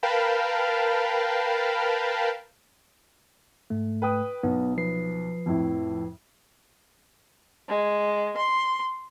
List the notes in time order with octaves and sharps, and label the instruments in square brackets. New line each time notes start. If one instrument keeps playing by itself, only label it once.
[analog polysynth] A#4 B4 F5 G5 A5 B5
[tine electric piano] G#2 A3
[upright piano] B4 G5 D#6
[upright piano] B1 [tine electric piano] B3
[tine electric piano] F3 B4 C7
[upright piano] F2 A2 E4
[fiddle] G#3
C6